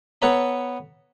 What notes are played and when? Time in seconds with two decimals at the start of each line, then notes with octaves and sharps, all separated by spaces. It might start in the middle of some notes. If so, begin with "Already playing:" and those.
0.22 B3 A4 B4 C#5 A#5 B5